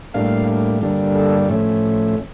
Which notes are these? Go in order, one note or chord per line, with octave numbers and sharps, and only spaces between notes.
A2 G3 A#3 D4 F5
G2 D3 G3 A#3 D4
A4
A2 F3 A3 C#4